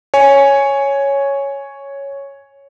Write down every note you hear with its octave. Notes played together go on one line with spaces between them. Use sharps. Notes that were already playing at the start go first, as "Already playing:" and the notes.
C#5 G#5